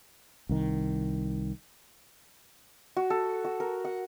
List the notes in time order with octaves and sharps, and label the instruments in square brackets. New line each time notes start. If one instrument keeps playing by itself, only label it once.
[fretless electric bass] C2 D#3
[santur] F#4
A4
F#4
A#4
F#5